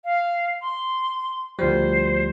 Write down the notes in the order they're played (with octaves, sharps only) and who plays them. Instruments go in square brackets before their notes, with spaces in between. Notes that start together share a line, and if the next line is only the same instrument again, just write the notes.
[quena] F5
C6
[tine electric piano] D2 F3 G3 [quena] C5